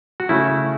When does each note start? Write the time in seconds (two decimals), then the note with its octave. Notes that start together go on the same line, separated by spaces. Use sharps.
0.20 F#4
0.29 C#3 A3 C#4 E4